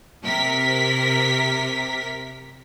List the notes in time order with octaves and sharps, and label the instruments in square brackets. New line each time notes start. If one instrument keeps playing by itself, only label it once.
[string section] C3 A#4 B6